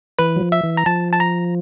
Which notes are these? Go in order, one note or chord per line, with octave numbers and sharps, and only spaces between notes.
E3 B4
F#3
F3
E5
E3
A#5
F3 A5
A5
A#5